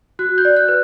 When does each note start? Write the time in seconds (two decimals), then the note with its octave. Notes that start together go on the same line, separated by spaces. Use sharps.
0.19 F#4 F#6
0.38 G6
0.45 D5
0.56 F#6
0.69 B4